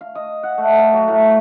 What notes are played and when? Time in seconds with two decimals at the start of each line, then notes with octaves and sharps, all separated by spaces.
0.01 F5
0.15 D#5
0.43 F#5
0.58 A3
0.79 F5
0.93 F#3
1.08 A2